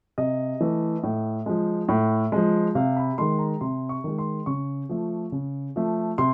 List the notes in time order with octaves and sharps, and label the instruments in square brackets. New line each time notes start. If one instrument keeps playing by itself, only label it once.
[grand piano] C3 D#5
E3 A3
A2
F3 G#3
A2
F3 G#3
C3 F5
B5
D#3 G#3 C6
A#5
C3 C6
C#6
D#3 G#3
C6
C#3 C#6
F3 A3
C#3
F3 A3
C3 C6